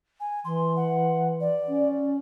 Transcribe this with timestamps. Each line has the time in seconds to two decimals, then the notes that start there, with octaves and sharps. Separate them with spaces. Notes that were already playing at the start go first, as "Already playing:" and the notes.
0.20 G#5
0.45 E3 C6
0.76 F#5
1.41 D5
1.68 C#4